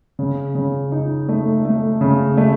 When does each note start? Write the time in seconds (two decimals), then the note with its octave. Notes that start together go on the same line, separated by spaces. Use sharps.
0.19 C#3
0.55 C#3
0.92 D#4
1.29 A3
1.65 A3
2.01 C#3
2.37 A3